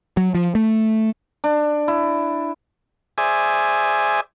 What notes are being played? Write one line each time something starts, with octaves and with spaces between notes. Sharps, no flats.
F#3
F3
A3
D4
E4
G#4 C5 D5 E5 G#5